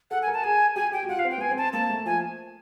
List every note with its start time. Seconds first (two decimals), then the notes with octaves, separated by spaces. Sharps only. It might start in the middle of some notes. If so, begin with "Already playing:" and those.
0.11 A4 F#5
0.22 G#5
0.27 A#4
0.33 A5
0.43 G#4 G#5
0.76 G4 G#5
0.92 G4 G5
1.03 F#4
1.09 F4 F#5
1.19 F5
1.25 C4
1.31 G5
1.38 B3 G#5
1.51 C4
1.58 A5
1.73 A#3 A5
1.89 A3
2.05 F3 G#5